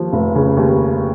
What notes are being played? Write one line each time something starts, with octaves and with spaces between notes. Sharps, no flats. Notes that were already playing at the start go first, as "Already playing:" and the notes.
Already playing: D#2 F3
F1
C#3
D#2